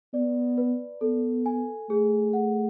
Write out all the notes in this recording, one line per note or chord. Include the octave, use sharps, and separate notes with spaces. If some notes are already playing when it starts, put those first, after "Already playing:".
B3 D5
B4
B3 A4
G#5
A3 G#4
F#5